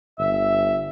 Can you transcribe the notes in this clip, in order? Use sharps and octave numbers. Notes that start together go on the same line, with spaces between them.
G1 E5